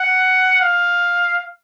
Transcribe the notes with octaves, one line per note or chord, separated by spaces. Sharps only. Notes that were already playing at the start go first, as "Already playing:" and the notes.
Already playing: F#5
F5